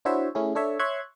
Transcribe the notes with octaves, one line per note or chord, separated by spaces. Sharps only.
D4 E4 F#4 C5 C#5 E5
A3 C#4 E4 G#4
D4 A4 C#5 E5
C#5 E5 C6 C#6 F#6 G#6